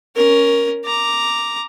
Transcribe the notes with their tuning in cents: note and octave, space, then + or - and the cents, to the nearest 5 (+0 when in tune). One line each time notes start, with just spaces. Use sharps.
C#4 +5 A#4 +10
A#5 +0 D6 +0